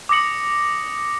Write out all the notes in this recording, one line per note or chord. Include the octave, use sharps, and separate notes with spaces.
D6 D#6 A#6 C#7 F#7